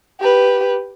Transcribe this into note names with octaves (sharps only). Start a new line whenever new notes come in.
G4 B4